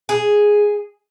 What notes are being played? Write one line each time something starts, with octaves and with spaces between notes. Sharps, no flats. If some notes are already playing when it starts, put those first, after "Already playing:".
G#4